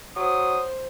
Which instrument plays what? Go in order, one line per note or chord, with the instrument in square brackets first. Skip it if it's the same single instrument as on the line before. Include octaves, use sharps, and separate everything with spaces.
[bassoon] F#3 [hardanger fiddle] C5 [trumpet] D#6